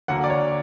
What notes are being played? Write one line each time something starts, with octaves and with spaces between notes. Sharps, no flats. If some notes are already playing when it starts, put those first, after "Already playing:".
D2 D3 F#3 A#3 F#5
D5
C#5